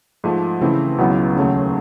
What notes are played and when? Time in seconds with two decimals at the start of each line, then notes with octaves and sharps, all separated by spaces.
0.24 G#2 F3 A3
0.61 C#3 E3 A3 C4 E4
0.98 C#2 B2 F#3 B3 E4
1.36 D#2 C#3 F#3 A3